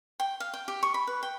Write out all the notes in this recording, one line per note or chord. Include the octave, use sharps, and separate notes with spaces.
G5
F5
G5
G4
C#6
B5
B4
G5